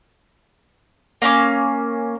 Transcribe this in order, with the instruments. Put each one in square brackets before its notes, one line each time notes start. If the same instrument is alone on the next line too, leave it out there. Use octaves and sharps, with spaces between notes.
[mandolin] A#3 C#4 D6